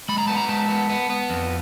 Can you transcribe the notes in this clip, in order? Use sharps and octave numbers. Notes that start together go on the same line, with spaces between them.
G#3 B5
A#5
B3 A5
A#5
G#3 A5
B3
B3
B3
F2